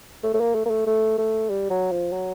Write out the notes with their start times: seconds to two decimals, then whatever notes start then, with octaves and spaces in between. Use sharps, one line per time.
0.23 A3
0.34 A3
0.40 A#3
0.55 A3
0.66 A#3
0.71 A3
0.87 A3
1.18 A3
1.50 G3
1.70 F#3
1.92 F3
2.12 F#3